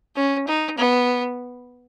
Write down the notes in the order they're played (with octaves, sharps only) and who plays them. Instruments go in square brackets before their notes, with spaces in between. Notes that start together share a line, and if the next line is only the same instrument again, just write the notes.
[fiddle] C#4
D#4
B3